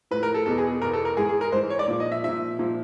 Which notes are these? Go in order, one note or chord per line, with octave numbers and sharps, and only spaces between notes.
A2 F3 B4
A#4
A4
E2 B2 A4
G#4
E2 B2 A#4
A4
A#4
G#2 E3 G#4
G#4
A#4
G#2 E3 C5
C#5
D5
A#2 F3
D#5
E5
A#2 F3 E5
A#2 F3